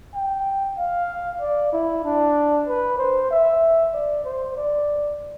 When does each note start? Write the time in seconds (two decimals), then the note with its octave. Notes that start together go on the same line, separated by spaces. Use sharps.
0.15 G5
0.78 F5
1.41 D5
1.73 E4
2.04 D4
2.67 B4
2.98 C5
3.31 E5
3.94 D5
4.24 C5
4.56 D5